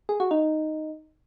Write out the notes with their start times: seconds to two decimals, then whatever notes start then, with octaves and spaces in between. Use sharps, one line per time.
0.09 G#4
0.20 F#4
0.31 D#4